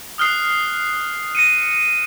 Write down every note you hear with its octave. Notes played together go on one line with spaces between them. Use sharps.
D#6 F6 F#6 C7
A#6 C#7 D#7